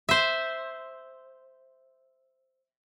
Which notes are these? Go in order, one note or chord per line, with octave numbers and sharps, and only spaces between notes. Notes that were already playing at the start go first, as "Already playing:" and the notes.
C5 E5